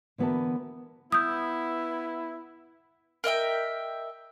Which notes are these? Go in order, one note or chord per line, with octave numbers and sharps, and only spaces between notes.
D3 E3 B3 F#4 A#4 A5
B3 E4 D#6 G6
A#4 D#5 E5 G5